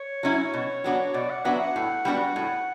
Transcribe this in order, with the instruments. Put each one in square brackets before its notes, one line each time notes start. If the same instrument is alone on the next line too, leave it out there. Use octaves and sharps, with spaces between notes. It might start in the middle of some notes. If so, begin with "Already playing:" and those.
Already playing: [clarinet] C#5
[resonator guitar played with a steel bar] F#3 C#4 E4
B2
F#3 B3 D4 F#4
[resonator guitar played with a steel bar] B2 [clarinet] D5
[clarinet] F#5
[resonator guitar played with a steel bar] F#3 B3 D4 F#4 [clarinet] E5
[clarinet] F#5
[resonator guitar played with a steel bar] A2
G3 B3 D4 F#4
A2